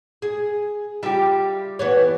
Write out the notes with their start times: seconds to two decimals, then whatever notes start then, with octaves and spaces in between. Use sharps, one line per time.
0.22 G#4
1.03 G3 F4 G4 E5
1.79 E3 B3 C#5